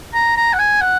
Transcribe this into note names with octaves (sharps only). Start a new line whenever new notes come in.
A#5
A#5
F#5
G#5
F#5